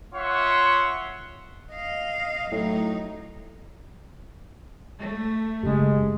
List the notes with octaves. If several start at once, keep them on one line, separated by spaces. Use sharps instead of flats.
F4 C#5 E5 F#5 C6 C#6
D#5 F5
A2 F#3 D#4
A3
F#1 C#3 G#3 G4